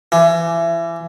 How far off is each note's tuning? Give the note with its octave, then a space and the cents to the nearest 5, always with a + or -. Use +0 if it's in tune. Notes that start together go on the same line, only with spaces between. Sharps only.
E3 +25